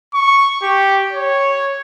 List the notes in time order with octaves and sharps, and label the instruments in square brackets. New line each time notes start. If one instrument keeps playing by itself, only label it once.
[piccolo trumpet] C#6
G4
C#5